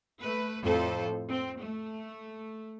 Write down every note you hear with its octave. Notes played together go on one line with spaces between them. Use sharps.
A3 B4
F2 A2 A4 C5
C4
A3